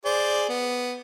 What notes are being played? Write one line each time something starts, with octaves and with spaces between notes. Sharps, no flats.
G#4 C5 D5
B3